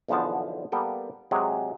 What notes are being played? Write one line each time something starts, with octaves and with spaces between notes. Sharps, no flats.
B1 E2 D3 F3 B3 A5
G3 A#3 B3 A4 G5
C3 F#3 G#3 G#4